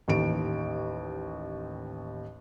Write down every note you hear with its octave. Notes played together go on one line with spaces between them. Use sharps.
A1 D#2 D7